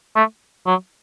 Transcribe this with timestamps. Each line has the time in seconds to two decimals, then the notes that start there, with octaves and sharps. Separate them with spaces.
0.16 A3
0.66 F#3